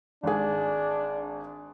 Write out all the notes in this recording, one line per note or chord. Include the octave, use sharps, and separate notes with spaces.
G#1 D4 G#4